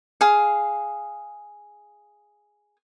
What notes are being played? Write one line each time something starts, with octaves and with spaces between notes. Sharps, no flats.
G#4 F5